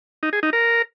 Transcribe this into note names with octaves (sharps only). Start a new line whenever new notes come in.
D#4
G#4
D#4
A#4